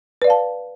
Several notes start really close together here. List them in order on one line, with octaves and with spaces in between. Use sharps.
B4 D5 F5 A5